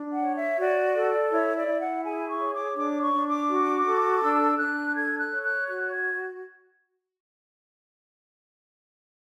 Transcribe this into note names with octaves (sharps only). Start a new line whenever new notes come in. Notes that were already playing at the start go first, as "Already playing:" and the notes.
Already playing: D4
F#5
C#5
E5
F#4 D5
A4
E4 C#5
D5
E4
F#5
G#4 G#5
C#6
C#5
D6
D4 D6
C#6
D4
D6
F#4
A4
D4 E6
D4 F#6
A4 G#6
F#6
C#5
F#6
F#4 F#6
G#6